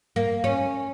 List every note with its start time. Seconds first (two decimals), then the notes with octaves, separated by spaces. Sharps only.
0.16 A#3
0.44 C#4